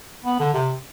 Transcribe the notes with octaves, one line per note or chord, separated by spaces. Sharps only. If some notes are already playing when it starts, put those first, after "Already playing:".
B3
D3
C3